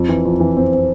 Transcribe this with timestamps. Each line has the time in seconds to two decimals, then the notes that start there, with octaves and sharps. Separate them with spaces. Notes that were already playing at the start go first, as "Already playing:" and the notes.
Already playing: F2
0.09 E3
0.25 F2
0.40 E3
0.57 C4
0.72 C4